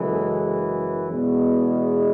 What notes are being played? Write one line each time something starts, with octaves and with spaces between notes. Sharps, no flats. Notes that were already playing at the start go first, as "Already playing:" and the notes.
Already playing: F#1 F#2 E3 G#3 A4
E2 B2 G#3